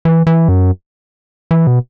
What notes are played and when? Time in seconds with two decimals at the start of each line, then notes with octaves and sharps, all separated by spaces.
0.05 E3
0.27 E3
0.49 F#2
1.51 E3
1.67 B2